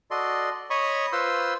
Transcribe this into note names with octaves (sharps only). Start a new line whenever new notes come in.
F#4 A4 D5 D#5 C6
C#5 D#5 B5 C#6 D#6
F4 B4 C5 C6 E6